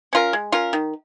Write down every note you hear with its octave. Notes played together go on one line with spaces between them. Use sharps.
C#4 F4 A#4
G#3
C#4 F4 A#4
D#3